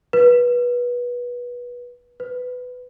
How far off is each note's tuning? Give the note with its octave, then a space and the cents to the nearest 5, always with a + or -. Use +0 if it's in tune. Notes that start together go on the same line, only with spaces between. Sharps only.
B4 -20
B4 +15